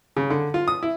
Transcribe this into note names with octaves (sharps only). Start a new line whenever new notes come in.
C#3
D3
F4
D#6
E4